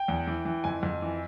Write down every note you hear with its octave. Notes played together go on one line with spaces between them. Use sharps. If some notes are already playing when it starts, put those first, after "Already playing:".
Already playing: G5
E2
E3
E3
F2 G#5
F2
E3